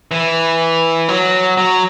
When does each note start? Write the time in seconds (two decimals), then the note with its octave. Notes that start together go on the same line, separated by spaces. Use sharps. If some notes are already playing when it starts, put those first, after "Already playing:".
0.11 E3
1.08 F#3
1.57 F#3